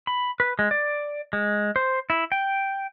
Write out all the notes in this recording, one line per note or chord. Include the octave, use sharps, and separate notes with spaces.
B5
B4
G#3
D5
G#3
C5
E4
G5